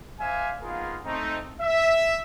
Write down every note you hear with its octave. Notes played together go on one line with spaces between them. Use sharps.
C5 D5 E5 F5 G#5
A#3 B3 D#4 F4 G#4 A#4
A3 C4 D#4
E5